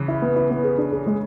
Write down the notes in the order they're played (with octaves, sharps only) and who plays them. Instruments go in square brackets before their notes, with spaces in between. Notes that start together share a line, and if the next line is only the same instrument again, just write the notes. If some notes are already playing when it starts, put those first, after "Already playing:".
Already playing: [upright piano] C#3 E3
[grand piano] E4
B3
E4
B3
G#4
D4
G#4
G#3